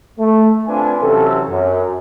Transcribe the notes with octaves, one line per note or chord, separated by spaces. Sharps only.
A3
C4 D4 F4 B4 G#5
C3 E3 F#3 C#4 A4
F#2